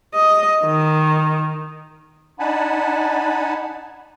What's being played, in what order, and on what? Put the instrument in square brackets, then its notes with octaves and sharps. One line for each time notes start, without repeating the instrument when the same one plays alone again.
[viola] D#5
D#3
[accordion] D4 D#4 F#5 G#5 A5 B5